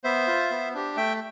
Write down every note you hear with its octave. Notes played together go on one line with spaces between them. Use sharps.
B3 C5 E5
F4
B3
D4 G4
A3 E5 G5